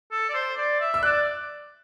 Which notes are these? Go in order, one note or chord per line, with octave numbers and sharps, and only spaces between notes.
A4
D5
C5
D5
E5
E6
D5 F#6